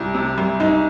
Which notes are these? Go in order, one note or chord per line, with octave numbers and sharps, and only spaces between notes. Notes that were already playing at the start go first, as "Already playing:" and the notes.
Already playing: C2 E4
C3
C2
C2 D#4